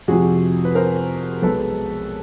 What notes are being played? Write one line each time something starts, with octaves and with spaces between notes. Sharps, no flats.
F2 C3 F3 F#4 G#4
B4
A#4 C5
B1 B2 G#3 A4 B4